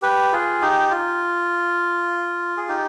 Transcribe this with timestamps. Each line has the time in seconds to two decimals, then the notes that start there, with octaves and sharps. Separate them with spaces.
0.02 G4 B4
0.32 F4 G#4
0.62 D#4 G4
0.91 F4
2.57 G#4
2.69 D#4 G4